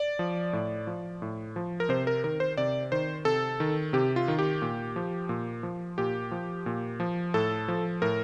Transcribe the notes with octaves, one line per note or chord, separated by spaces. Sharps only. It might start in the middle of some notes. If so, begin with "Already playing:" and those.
Already playing: D5
F3
A2
F3
A2
F3
A#4
C3 C5
A#4
D#3 A#4
C5
C3 D5
D#3 C5
C3 A4
D#3
C3 G4
F4
D#3
G4
A#2
F3
A#2
F3
A#2 G4
F3
A#2
F3
A2 A4
F3
A2 A#4